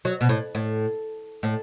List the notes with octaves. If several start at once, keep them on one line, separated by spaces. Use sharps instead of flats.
F#3
B2
A2
A2
A2